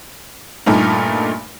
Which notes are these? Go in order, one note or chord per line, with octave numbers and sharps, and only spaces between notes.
G2 A#2 A3 A#3 D#4